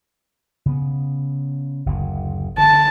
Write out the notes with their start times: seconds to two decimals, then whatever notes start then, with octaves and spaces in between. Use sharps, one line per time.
0.66 C#3 B3
1.86 F#1 D2
2.58 D3 A5